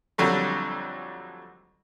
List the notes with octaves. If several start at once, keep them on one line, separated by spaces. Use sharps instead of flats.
F2 D3 F#3 G3 A3